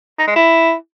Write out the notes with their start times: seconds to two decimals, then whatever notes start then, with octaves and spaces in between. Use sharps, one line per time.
0.19 D#4
0.27 G#3
0.36 E4